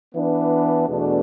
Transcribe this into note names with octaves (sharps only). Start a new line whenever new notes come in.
E3 B3 D4
E2 B2 A3 D4